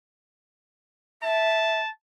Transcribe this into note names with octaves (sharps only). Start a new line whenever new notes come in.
E5 A5